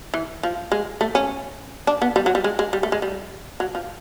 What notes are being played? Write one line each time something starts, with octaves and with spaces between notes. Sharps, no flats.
E3
F3
G#3
A3
C#4
D4
B3
G3
F#3
G3
G#3
G#3
G3
A3
G#3
G3
F#3
F3